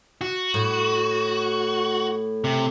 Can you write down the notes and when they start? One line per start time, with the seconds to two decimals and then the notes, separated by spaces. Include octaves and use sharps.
0.21 F#4
0.54 A2
2.44 C3